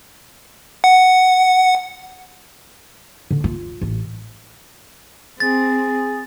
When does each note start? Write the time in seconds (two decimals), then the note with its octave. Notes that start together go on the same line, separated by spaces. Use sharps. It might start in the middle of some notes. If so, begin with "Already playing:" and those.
0.84 F#5
3.31 D3
3.44 F4
3.81 A1
5.40 C4 G#4 A6